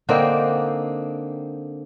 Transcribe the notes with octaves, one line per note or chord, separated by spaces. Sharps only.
D3 A#3 C4 D#4